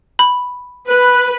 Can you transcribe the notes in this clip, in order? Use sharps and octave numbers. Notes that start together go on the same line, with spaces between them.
B5
B4 F#6